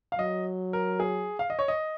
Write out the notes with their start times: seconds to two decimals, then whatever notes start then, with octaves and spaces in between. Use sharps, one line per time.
0.12 F5
0.19 F#3 D#5
0.73 A#4
1.00 G#4
1.39 F5
1.50 D#5
1.59 C#5
1.68 D#5